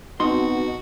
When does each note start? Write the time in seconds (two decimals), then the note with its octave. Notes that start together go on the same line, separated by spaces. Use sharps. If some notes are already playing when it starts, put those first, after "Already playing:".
0.20 B2 C4 D#4 F#4 C6